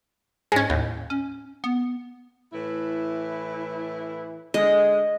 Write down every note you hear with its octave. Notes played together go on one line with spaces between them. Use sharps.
G#2 G#3 C#4
D#2 A2
C#4
B3
A2 E3 E4
D3 G#3 D#5